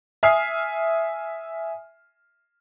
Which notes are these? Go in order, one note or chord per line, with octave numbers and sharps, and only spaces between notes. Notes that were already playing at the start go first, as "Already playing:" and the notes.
E5 G#5 D#6 F6 C7